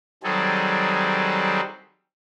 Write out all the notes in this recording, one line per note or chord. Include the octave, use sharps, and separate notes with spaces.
D#3 F#3 G3 C4 G#4 A4